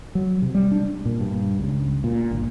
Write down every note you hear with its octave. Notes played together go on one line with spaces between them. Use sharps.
F#3
C3
G3
D4
A#2
G2
C#2
A#2
G1